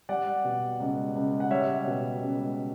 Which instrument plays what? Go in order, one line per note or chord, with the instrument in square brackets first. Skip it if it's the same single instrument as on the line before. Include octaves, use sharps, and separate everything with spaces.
[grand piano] G3 D5 F#5
B2
C#2
C#2
F#5
G3 C#5 E5
B2
C#2